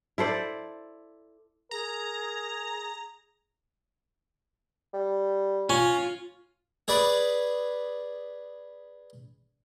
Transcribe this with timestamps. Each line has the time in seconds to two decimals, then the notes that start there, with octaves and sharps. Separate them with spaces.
0.18 E4 A4 C5 D5
1.71 G#4 A#4 A#5
4.93 G3
5.70 C#4 F4
6.88 G#4 B4 D5